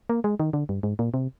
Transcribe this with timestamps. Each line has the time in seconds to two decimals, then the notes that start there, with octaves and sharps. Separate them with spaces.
0.09 A#3
0.24 G#3
0.40 D#3
0.53 D3
0.69 G2
0.83 G#2
0.99 A#2
1.14 C3